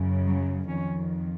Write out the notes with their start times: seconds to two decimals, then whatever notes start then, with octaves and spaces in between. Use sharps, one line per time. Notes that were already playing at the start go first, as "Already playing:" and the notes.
Already playing: F#2 C#3
0.26 F#3
0.68 F2 D#3 C#4